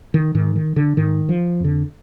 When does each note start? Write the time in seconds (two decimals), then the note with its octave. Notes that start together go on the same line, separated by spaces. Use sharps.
0.14 D#3
0.35 G#2 D#3
0.56 D#3
0.76 D3
0.97 G#2 D#3
1.29 F3
1.60 F2 D3